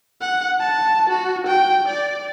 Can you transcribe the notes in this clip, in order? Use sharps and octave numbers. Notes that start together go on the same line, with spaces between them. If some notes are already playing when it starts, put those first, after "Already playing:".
F#5
A5
F#4
G5
D5